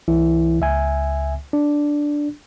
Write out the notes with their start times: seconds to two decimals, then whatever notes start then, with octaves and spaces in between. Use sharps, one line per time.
0.08 C2 E3 E4
0.61 C#2 E5 G#5
1.53 D4